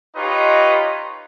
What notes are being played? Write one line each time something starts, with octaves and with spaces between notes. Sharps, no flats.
D#4 F4 G4 B4 C#5 D#5